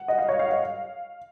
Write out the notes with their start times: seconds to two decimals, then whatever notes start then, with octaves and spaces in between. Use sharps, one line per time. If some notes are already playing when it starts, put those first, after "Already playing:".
Already playing: F#5
0.08 D#5
0.18 F5
0.28 C#5
0.39 F5
0.50 F5